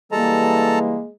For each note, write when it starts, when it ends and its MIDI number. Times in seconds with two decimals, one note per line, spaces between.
0.12 0.98 52
0.12 0.98 55
0.12 1.12 56
0.12 1.07 58
0.12 0.79 69
0.12 0.79 81
0.12 0.79 82